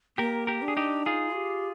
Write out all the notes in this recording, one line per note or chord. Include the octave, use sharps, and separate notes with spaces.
A#3 G4 A#4
G4 A#4
D4
G#4
D#4 G4
D#4 F4 G#4
G4